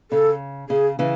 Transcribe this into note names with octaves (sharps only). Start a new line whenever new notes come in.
C#3 A4
C#3 G#4
C#3 E3